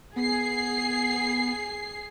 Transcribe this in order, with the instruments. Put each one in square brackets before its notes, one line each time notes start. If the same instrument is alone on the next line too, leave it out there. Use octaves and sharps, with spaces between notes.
[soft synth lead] B3 [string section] G#4 C7